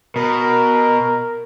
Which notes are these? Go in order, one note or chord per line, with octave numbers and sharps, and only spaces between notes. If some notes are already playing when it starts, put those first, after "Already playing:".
B2 A#4